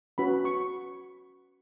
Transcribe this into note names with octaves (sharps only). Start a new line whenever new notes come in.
C#4 F#4 B4 B5
C#6